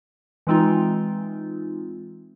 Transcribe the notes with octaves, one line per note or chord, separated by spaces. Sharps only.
E3 G#3 C4 D#4 F4